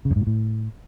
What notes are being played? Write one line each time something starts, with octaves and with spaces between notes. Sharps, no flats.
C#3
F#2
G#2
A#2
A2